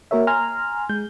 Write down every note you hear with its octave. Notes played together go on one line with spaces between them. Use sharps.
A#3 F#4 A#4 C#5 E5
G#5 A#5 C6 F6
G#3 G6